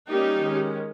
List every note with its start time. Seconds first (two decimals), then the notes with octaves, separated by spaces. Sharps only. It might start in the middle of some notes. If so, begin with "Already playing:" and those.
0.09 G3 A#3 C#4 D#4 G4
0.43 D#3 G#3 C#4